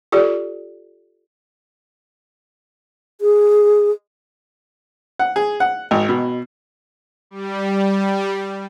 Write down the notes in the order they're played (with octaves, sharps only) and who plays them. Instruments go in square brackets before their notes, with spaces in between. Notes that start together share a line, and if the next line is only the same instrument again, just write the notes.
[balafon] F4 G4 A4 D5
[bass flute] G#4
[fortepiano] F#5
G#4
F#5
G#1
B2
[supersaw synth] G3